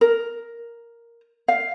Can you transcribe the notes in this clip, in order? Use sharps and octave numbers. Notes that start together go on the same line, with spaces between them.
A#4
F5